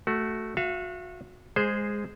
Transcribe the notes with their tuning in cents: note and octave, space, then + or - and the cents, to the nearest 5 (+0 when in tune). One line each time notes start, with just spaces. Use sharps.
A3 +0 F#4 +10
F#4 -30 E5 +45
G#3 -10 G#4 +0 C5 +0